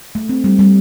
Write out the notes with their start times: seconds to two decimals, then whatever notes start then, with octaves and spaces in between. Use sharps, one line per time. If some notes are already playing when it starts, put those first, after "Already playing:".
0.15 A3
0.29 C4
0.44 G3
0.59 G3